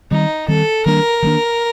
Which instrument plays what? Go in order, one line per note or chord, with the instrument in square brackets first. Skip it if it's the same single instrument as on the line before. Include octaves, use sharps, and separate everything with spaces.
[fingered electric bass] D#3 G3 C4 [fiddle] D#4
[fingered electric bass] D#3 G3 C4 [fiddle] A4
[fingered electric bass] D#3 G3 A#3 D4 [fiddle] A#4
[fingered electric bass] D#3 G3 A#3 D4